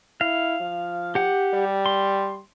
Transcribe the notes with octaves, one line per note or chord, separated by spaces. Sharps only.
E4 F5
F3
G4 F#5
G3
C6